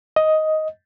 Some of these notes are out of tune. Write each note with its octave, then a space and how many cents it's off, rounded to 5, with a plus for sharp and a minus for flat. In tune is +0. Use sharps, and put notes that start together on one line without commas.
D#5 +10